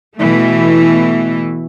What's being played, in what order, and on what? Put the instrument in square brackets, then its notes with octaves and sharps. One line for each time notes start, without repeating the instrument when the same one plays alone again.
[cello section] B2 E3 A3